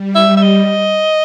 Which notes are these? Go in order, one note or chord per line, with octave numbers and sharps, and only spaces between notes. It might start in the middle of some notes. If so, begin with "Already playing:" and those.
Already playing: G3
E5
E5
D#5